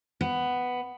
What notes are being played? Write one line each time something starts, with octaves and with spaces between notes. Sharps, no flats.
B3